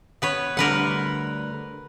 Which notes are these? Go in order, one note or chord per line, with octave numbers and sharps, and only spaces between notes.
B3 B4 C#5
D2 D3 G3 A#4 B4 F#5